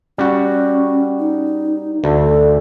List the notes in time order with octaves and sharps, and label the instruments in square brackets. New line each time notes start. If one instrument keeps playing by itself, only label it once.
[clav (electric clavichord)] G3 F#4 [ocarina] C#4
[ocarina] D#4
[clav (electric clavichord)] D2 [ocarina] A4